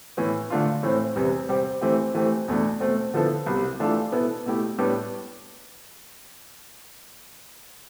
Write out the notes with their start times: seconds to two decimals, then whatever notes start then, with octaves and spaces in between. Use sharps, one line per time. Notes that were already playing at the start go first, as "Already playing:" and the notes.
0.17 A2 E3 B3
0.50 D3 A3 D4 F4
0.83 A2 E3 A3 C4
1.16 E2 C3 G3 B3
1.49 C3 G3 C4 G4
1.81 E3 A3 C4 G4
2.15 E3 A3 C4 G4
2.48 E2 B2 A3 D4
2.80 B2 A3 C4
3.14 D3 F3 B3 E4 A4
3.46 C2 B2 G3
3.80 E3 A3 D4 F4 A4
4.12 B2 B3 E4 A4
4.46 B2 A3 E4 G4
4.78 A2 G3 B3 D4 G4